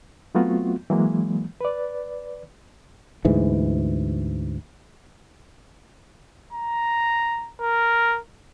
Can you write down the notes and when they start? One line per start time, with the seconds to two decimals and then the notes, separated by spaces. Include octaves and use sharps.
0.35 F#3 A3 B3 C4 F4 F#4
0.90 E3 F#3 G#3 A#3
1.61 B4 D5
3.25 D2 G#2 E3
6.53 A#5
7.61 A#4